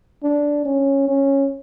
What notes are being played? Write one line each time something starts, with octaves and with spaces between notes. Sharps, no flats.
D4
C#4
C#4